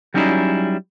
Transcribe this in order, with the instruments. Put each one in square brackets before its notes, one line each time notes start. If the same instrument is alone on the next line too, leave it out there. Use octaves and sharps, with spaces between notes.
[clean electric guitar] F#3 G3 C#4 D#4 E4 G#4